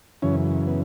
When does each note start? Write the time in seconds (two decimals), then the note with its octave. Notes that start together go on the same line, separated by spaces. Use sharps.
0.22 F#2 C#3 E3 C#4
0.67 B3